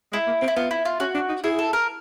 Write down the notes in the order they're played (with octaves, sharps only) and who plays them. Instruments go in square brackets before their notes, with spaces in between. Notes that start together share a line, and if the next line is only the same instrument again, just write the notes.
[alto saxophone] G#3 [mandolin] E4
[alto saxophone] A#3
C4
[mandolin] E4
[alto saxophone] B3 [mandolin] F4
[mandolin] E4
F4
[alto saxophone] C#4 [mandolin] F#4
[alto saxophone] D4
D#4
[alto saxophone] E4 [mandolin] G#4
[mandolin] A4
A#4